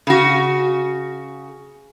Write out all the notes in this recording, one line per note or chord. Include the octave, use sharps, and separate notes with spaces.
C#3 F#4